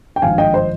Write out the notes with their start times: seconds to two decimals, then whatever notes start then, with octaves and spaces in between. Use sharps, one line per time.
0.16 G5
0.22 G#1 G2 F3 F5 G#5
0.38 D#5 G5
0.54 C5 D#5